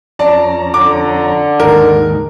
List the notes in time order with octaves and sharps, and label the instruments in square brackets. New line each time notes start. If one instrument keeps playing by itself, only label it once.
[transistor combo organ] F2 C#4 A#5 [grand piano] D5 A5
[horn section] D3 [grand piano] D6
[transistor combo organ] D#2 G#2 D#3 [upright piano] A#4